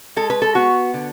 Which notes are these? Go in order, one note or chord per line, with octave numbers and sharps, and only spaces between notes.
G#3 A4
B4
A4
B3 F#4
D3